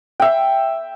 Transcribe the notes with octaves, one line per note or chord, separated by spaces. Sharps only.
E5 G5